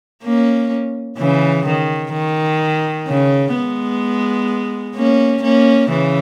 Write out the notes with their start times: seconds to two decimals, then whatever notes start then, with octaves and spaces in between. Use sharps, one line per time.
0.24 A#3 C#4
1.18 C#3 E3
1.66 D#3
2.13 D#3
3.07 C#3
3.53 G#3 B3
4.95 A#3 C#4
5.42 A#3 C#4
5.89 C#3 E3